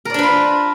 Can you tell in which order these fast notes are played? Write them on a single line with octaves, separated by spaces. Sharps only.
A#4 D5 D4 B4 F4